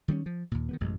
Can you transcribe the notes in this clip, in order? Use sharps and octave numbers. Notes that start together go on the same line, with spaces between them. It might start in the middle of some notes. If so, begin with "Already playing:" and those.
D#3 G3 B3 C#4
F3
D#2 A#2
D#3 G3 B3
A1 F#2 B2 G#3